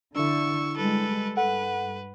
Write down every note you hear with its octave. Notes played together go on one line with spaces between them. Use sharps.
D3 D4 E4 C#6 E6
G3 G#3 A4 B4
G2 A4 B4 F#5